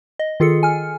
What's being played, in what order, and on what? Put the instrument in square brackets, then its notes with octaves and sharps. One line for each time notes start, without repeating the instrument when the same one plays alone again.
[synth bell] D#5
D#3 F4 G#4 A4 C#7
G#5 F6